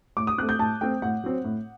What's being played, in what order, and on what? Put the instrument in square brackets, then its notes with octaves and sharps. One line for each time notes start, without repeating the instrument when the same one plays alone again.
[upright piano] A2 D6
D#6
C4 F#6
A3
G6
A2 A5
A3 C4 G5
A2 F#5
F#3 C4
A2